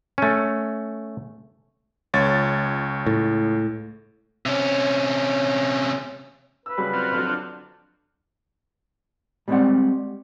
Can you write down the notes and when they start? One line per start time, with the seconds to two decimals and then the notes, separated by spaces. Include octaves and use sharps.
0.18 A3 C#4
2.14 C#2 C#5 A6
3.06 A2
4.46 C3 C#4
6.66 B4 E6
6.78 C#3 F#3 G3
6.93 C4 F4 F#4
7.12 F2 D3 F#3
7.25 D4
9.48 G3 G#3 B3 C4 D5 F#5